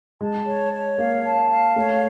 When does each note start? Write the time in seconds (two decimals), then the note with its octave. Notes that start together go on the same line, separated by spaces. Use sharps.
0.21 G#3 A5
0.47 C#5
0.72 C#5
0.98 A#3 F5
1.24 A5
1.50 F5
1.76 A3 C#5